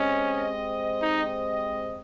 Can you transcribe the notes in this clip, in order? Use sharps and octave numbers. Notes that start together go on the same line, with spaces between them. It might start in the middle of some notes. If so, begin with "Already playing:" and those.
Already playing: G#3 C4 C#4 G4 C5 D#5
D#4